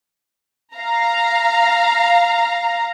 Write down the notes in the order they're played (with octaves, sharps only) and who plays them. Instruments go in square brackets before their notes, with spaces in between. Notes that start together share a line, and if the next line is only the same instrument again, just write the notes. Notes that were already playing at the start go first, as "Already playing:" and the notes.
[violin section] F5 A#5